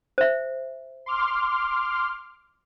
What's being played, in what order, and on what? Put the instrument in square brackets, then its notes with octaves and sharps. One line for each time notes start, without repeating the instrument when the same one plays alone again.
[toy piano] C5 E5
[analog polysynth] C6 D6 F6